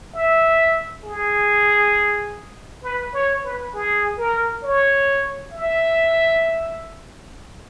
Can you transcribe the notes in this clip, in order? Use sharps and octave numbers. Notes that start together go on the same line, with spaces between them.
E5
G#4
B4
C#5
B4
G#4
A#4
C#5
E5